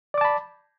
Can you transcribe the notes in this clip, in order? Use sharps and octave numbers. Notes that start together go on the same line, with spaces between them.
D5 A5 B5 D6